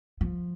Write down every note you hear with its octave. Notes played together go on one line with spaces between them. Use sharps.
F3